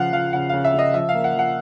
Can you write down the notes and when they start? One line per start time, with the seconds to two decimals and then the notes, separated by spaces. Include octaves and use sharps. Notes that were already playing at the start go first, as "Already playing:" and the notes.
Already playing: C#3 F3 F5 F#5
0.13 F3 F5
0.33 C#3 F#5
0.49 C#3 F5
0.64 E5
0.74 C#3 D#5
0.94 F3 E5
1.09 F5
1.14 A#3
1.24 F#5
1.35 F3 F#5